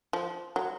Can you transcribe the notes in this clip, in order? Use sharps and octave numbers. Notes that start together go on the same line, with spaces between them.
F3
F#3